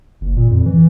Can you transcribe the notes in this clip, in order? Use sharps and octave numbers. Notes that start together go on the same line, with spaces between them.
F#1
A#2
F2
E3